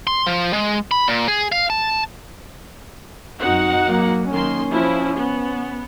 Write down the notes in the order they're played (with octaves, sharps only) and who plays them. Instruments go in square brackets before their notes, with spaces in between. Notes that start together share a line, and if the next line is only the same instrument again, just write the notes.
[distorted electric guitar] C6
F3
G#3
B5
A#2
G#4
F5
A5
[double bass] F#2 C4 [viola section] D#4 F#4 F#5
[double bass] F#3 A#3
[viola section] D#3 A#3 C6 [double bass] C#4
[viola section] F3 E4
B3